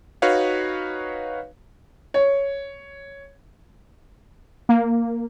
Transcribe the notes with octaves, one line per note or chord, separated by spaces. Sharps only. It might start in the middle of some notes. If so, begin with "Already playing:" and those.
D#4 F#4 B4 C#5 F5
C#5
A#3